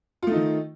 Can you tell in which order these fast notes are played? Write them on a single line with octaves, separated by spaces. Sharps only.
F4 A3 D#4 D#3